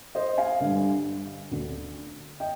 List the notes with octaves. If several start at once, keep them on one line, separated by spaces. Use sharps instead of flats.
C5 D#5
F5 G#5
G2 D3
D2 D3
D#5 G5